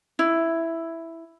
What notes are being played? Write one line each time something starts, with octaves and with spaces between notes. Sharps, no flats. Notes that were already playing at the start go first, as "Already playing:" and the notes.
E4